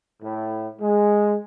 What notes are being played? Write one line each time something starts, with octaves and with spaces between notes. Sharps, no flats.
A2
G#3